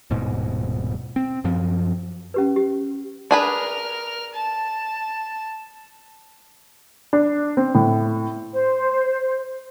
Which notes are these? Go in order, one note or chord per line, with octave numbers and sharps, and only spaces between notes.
D#1 G#2 B2
C4
F#2 F3
C#4 G4 B4
G4
D4 G#4 A#4 B4 F6
A5
D4
C4
A2
C5